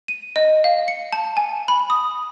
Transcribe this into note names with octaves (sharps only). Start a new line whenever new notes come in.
D#7
D#5
F5
C#7
A5
G#5
B5
D#6